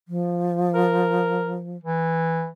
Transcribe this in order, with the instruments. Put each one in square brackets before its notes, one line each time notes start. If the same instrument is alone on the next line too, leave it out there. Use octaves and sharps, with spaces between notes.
[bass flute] F3
[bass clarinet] A#4
E3